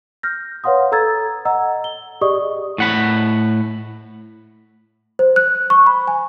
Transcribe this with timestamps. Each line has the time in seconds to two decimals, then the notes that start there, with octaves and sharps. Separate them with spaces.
0.23 F6 G6 A#6
0.64 B4 C#5 F5 F#5 C6 D#6
0.92 A4 A#5 E6 G#6 A6
1.45 D#5 F#5 A#5 E6
1.84 G7
2.21 G4 G#4 D5 D#5 C#6 D#6
2.78 A2 F#5 B5
5.19 C5
5.36 F#6
5.70 C#6
5.87 B5
6.08 G#5